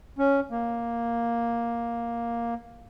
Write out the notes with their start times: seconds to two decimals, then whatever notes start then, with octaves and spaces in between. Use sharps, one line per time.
0.19 C#4
0.51 A#3